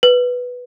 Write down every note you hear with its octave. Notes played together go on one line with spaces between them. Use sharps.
B4